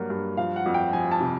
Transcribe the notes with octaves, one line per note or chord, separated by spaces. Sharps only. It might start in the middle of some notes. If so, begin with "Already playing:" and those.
Already playing: G2 F#3 A#3
G2
F3 F5
F#5
F2
G5
F3 G#5
A5
C3